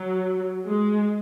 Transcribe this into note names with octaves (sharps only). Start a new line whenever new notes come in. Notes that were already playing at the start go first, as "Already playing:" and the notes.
Already playing: F#3
G#3